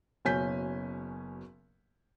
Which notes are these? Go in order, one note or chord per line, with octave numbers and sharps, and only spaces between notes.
F#1 B2 C#4 G#5 G6 B6